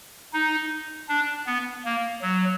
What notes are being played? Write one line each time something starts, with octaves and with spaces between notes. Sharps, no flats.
D#4
D4
B3
A#3
F#3